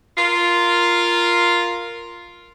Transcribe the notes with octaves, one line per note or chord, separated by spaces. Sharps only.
F4 A#4